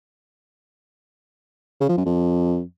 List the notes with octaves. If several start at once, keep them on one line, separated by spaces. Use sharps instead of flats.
C#3
F3
F#2
F2